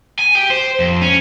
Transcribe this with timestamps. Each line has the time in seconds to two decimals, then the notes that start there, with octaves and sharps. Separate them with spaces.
0.19 G#5
0.35 G4
0.50 C5
0.80 F2
1.02 C#4